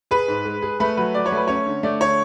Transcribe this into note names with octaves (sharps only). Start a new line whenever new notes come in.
G#4 B4
G#2
G#3
G#4
A3 B4
F#3 B4
F#3 D5
C#5
A3 B4
C#4 C#5
D3
A3 D5
D3 C#5